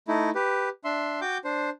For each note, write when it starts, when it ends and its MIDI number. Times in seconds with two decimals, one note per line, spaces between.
0.08 0.30 57
0.08 0.30 63
0.08 0.30 64
0.35 0.69 67
0.35 0.69 71
0.84 1.20 62
0.84 1.20 76
0.84 1.20 84
1.21 1.38 66
1.21 1.38 79
1.21 1.38 86
1.21 1.38 91
1.44 1.70 62
1.44 1.70 72